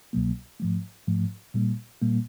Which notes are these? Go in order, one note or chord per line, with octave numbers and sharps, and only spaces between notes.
C2 B2 F#3 A#3
G#2 F3 A3
G#2 F3 A3
A#2 G3 A#3
A#2 G3 A#3